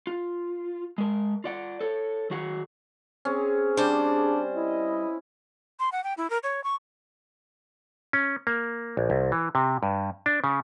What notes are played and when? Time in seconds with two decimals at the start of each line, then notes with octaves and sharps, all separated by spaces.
0.07 F4
0.98 G#3 A#4
1.44 F4 D5 F#5
1.81 A4 C#5
2.30 D#3 F#3 F#4 G#4 F#5
3.25 C4 C#4 G#4
3.77 G3 D4 C5
4.55 E4 D#5
5.79 C6
5.92 F#5
6.04 G5
6.17 E4
6.30 A#4
6.43 C#5
6.64 C#6
8.13 C#4
8.47 A#3
8.97 A#1
9.10 C2
9.32 E3
9.55 C3
9.83 G2
10.26 D4
10.44 C#3